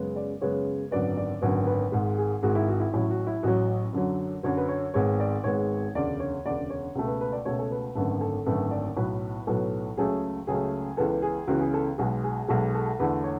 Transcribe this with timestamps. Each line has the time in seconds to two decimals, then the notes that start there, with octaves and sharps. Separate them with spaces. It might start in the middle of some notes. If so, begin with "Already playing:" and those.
Already playing: F#2 C#3 G#3 B3
0.16 D5
0.41 F#2 C#3 G#3 B3 C#5
0.91 G#1 F#2 D3 F#3 B3 D5
1.17 D5
1.42 G#1 F#2 D3 F#3 B3 C#5
1.67 B4
1.92 G#1 G#2 G#3
2.18 G#4
2.43 G#1 G#2 G#3 F#4
2.55 E4
2.68 F#4
2.80 E4
2.93 A1 A2 F#3 E4
3.10 F#4
3.27 E4
3.43 A1 A2 F#3 F#4
3.93 F#2 D3 F#3
4.43 F#2 D3 F#3 C#5
4.57 B4
4.69 C#5
4.94 G#1 G#2 G#3 B3 C#5
5.20 D5
5.44 G#1 G#2 G#3 B3 C#5
5.94 E1 D2 C#3 D5
6.20 C#5
6.45 E1 D2 C#3 D5
6.70 C#5
6.95 C#2 B2 A3
7.07 B4
7.21 B4
7.32 D5
7.45 C#2 B2 A3 C#5
7.59 A4
7.71 B4
7.95 G#1 F#2 D3 A3 B4
8.21 A4
8.46 G#1 F#2 D3 A3 B4
8.71 D5
8.96 B1 A2 F#3 B3 B4
9.47 B1 A2 F#3 B3 A4
9.97 C#2 C#3 F#3 A3 G#4
10.47 C#2 C#3 F#3 A3 G#4
10.97 C#2 C#3 E3 B3 A4
11.22 G#4
11.47 C#2 C#3 E3 B3 F#4
11.60 G#4
11.74 A4
11.98 B1 B2 G#3 G#4
12.24 G#4
12.48 B1 B2 G#3 A4
12.74 A4
13.00 E2 D3 A3 B4
13.24 C#5